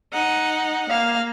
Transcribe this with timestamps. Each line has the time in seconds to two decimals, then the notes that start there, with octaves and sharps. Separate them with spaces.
0.13 D#4 F#5
0.90 A#3 F5